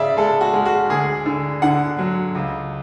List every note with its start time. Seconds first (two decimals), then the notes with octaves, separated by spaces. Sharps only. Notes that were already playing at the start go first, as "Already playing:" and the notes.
Already playing: C#3 D5 E5
0.17 G#3 A4
0.41 F#4
0.53 G#3
0.65 F#4
0.90 D2 G#4
1.26 D3
1.62 D3 F#5
1.98 F#3
2.35 C#2